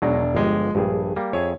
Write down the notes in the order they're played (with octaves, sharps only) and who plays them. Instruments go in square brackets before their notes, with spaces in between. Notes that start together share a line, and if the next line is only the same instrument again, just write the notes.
[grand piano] E1 D4 [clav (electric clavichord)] F#3 G#3 D#4
[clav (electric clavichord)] G1 G4 [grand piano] F3 G#3
[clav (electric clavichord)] A#1 G2 [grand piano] G3 G#4
[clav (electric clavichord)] G3 A#3
[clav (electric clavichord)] F2 G#4 E5 [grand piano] C#5